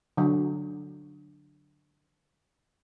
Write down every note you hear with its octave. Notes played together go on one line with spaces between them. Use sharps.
D3 F#3